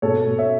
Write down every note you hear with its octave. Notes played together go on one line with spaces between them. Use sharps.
B2 A4 C#5
B2
C#5 E5